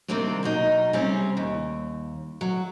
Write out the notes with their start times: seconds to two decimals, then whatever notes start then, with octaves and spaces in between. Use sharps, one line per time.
0.08 C3 D#3 G3 A#3 C4 D4
0.43 B2 F#3 D#4
0.93 C3 G3 C4 C#4
1.37 D#2
2.41 F#3